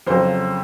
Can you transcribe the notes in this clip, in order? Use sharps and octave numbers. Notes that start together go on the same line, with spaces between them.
F2 C#3 F#3 C5